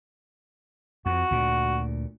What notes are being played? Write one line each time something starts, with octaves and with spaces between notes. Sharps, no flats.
F2 F#4
D2 A#2